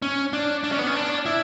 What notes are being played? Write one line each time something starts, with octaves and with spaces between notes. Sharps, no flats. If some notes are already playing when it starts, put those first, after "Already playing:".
C#4
D4
D4
C#4
B3
C#4
D4
E4